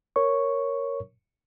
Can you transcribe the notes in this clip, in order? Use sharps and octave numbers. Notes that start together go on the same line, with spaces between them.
A#4 C#5 C#6